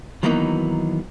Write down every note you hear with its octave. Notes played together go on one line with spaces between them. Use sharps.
D#3 E3 F#3 A#3 B3 D#4